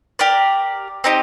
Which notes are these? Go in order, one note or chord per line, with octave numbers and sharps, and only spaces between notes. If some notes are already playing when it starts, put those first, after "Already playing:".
G4 A#4 D5
C4 D#4 G4